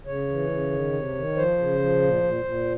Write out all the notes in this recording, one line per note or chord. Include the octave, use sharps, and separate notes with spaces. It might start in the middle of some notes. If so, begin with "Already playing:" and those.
C#3 C#5
E3
C#3
D#3
C3
D#3
F3 C5
C#3
F3
A#2
A#2
A#2